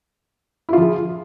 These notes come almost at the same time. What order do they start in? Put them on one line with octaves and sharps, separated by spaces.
E4 F4 F3 G#4